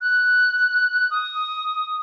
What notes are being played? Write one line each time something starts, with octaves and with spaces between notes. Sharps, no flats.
F#6
D#6